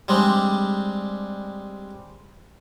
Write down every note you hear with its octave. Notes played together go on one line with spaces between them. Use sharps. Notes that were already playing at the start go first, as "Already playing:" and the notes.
G3 G#3 C4 D4